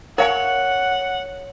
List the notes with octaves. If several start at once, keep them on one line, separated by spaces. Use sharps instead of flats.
A#4 C#5 F5 F#5 G#5